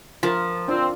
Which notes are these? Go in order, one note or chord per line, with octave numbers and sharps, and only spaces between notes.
F3 F4 A#4
C4 D4 F4